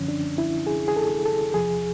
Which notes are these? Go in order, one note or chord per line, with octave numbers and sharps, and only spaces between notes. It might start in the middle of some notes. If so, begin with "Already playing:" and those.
Already playing: F#2 D3 F3 C#4
D4
E4
G#4
G#4
A4
A4
E2 C3 F3 G#4